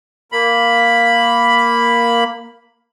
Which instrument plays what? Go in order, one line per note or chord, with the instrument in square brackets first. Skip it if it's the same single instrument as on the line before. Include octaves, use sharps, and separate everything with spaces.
[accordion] A#3 B5